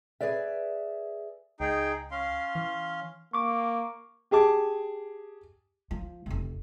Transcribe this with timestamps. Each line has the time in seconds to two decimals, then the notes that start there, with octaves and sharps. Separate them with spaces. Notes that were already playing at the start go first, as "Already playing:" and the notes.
0.21 G#4 B4 D5 E5
1.60 C#2 D#4 G#4 G5
2.11 C#4 F5 C6
2.55 E3
3.33 A#3 C#6 D6
4.31 G4 G#4 A5 D6
5.91 F3
6.26 F1 C3